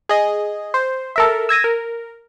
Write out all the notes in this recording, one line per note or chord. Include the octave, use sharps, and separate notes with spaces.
G#4 D#5
C5
A4 A#4 E5
E6 G#6 A#6 D#7
A#4